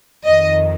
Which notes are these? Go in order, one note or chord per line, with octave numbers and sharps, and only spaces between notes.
F2 D#3 D#5